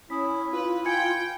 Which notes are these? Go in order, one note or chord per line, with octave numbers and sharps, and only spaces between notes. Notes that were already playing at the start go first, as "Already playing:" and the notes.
C#4 E4 D#6 B6
F4 B4
G5 G#5 G#6 C#7